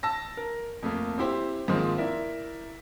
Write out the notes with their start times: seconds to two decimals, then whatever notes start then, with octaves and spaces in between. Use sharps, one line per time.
0.03 A5 E6 A#6
0.37 A#4
0.83 F2 A3 A#3
1.18 C4 E4 G4 C5
1.68 G#2 D#3 F3 A#3 C4 F4
1.98 E4 A#4 D5 E5